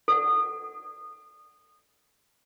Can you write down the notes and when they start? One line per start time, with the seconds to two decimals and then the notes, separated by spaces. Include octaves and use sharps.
0.08 A4 D5 F#5